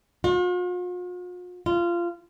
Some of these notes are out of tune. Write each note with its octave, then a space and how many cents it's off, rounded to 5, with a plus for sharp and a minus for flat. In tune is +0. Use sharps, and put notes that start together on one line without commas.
F4 +45
F4 -20